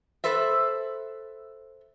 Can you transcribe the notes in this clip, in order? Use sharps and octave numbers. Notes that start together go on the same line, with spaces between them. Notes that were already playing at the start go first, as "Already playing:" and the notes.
A4 B4 C5 E5